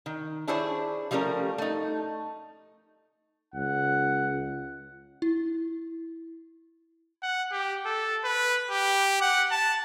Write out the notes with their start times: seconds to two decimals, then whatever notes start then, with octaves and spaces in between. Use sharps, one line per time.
0.06 D#3
0.48 D4 E4 G#4 C5 C#5
1.11 F3 G3 A3 C#4 A#4
1.58 A3 D#4
3.54 C#2 F#5
5.22 E4
7.23 F#5
7.52 G4
7.85 A4
8.24 B4
8.71 G4
9.21 F#5
9.51 A5